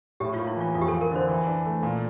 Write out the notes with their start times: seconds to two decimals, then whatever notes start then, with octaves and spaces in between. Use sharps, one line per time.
0.20 A2 G4
0.34 A#3 F4
0.47 E4
0.57 E3 F4
0.74 F2 F4
0.81 G4
0.88 A4
0.93 F3
1.01 A#4
1.11 D3 C5
1.29 E3
1.47 D4
1.66 A3
1.83 A#2